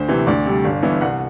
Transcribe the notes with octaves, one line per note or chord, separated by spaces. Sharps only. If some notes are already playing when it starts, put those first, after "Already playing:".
Already playing: D2 C5
C3 E3 B3 E4
D2 D5
C3 G3
G1 D5
G2 E3 B3 E4
C2 F#5